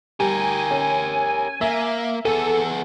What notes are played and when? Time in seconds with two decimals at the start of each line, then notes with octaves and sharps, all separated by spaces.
0.20 G3 G4 A#4 G#5
0.71 C#4
1.61 A#3 E5
2.25 B3 G#4 A4 D#7